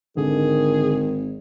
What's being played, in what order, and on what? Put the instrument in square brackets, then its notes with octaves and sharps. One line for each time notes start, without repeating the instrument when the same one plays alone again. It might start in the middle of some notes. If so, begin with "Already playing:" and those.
[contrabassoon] G#1 [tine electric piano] D3 [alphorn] D#3 [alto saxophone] G#4